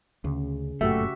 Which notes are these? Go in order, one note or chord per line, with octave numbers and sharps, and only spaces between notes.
D2 C#3
G1 F#2 A#2 A3 F#4 G4 E5